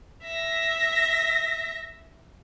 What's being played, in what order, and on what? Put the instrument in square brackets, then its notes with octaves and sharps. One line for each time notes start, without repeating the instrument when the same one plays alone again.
[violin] E5 A#6